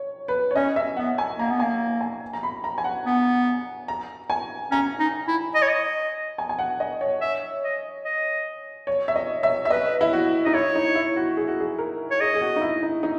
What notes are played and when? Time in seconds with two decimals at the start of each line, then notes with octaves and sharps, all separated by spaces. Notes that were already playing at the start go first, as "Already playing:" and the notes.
Already playing: C#5
0.28 B4
0.51 C#5
0.55 C#4 D#5
0.76 E5
0.97 B3 F#5
1.18 G#5
1.39 A#3 A#5
1.51 B3
1.60 A#3 G#5
2.01 G#5
2.33 A#5
2.43 B5
2.64 A#5
2.78 G#5
2.84 F#5
3.06 B3
3.88 A#5
4.30 G#5
4.71 C#4 A#5
4.99 D#4
5.28 E4
5.55 D#5
5.62 C#5
5.69 D#5
6.38 G#5
6.49 G#5
6.59 F#5
6.80 D#5
7.01 C#5
7.21 E5
7.63 D#5
8.05 D#5
8.87 C#5
9.08 E5
9.16 D#5
9.43 E5
9.65 E5
9.70 B4 D#5
10.01 E4
10.13 F#4
10.45 D#4 D#5
10.54 E4 C#5
10.75 D#4
10.95 E4
11.16 F#4
11.37 G#4
11.48 F#4
11.60 G#4
11.78 A#4
12.11 C#5
12.20 G#4 D#5
12.34 G#4
12.41 F#4
12.56 D#4
12.61 E4
12.83 D#4
13.03 D#4